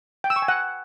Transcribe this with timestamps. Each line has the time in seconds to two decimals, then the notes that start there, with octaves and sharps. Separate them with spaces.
0.24 G5
0.30 E6
0.36 C#6
0.42 G#5
0.48 F#5